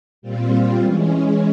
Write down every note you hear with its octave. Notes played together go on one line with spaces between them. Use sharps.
A#2 G3 C4 F4
E3 G#3 C#4